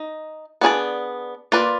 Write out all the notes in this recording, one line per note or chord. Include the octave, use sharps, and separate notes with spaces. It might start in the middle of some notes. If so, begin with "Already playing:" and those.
Already playing: D#4
B3 D4 G#4 B4 D5
A#3 F4 B4 D5